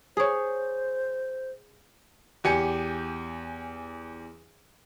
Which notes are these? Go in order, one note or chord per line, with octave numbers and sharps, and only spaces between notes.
G#4 C5 C#5
E2 G4 G#5 C#7